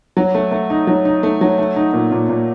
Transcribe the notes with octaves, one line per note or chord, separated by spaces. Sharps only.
F#3
A3
A3
D#4
F#3
D#4
A3
F#3
A3
D#4
A#2
A#2
A#2